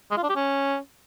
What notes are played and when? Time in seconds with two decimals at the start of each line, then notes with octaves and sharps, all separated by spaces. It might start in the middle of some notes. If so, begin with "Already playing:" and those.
0.11 G#3
0.17 F4
0.23 D4
0.29 G4
0.36 C#4